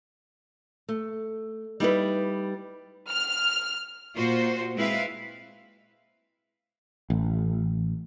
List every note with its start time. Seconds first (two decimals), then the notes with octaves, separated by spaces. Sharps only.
0.88 A3
1.80 G3 D#4 E4 B4
3.10 F6
4.15 A#2 F4 F#4 C5
4.75 G#3 C4 E4 B4 F5
7.10 A1